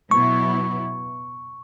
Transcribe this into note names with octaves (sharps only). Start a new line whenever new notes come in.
B2 F#3 B3 E4 C#6